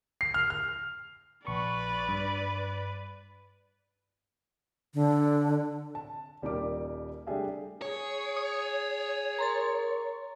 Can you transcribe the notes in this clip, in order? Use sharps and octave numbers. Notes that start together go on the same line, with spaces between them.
C7
F6
F6
A#1 B4 D5 C#6
G2
D3
A5
D#1 G3 A#3 D#4 A#4 D6
G3 A3 D4 G4 G#4 E5
G#4 C#5
D#6
A#4 A#5 C6 A6